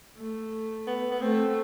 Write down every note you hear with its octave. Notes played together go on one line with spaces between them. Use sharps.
A3
B3
B3
A3 C4